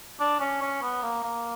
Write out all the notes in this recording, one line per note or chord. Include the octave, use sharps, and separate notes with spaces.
D4
C#4
C#4
B3
A#3
A#3